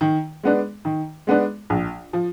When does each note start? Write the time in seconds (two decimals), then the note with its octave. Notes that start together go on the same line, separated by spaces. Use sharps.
0.01 D#3
0.43 G#3 B3 D4
0.85 D#3
1.27 G#3 B3 D4
1.70 A#1
2.13 F3